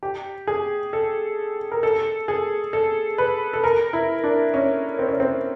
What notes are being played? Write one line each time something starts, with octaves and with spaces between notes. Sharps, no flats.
G4
G#4
A4
A#4
A4
G#4
A4
B4
A4
A#4
E4
D4
C#4
C4
C#4
C4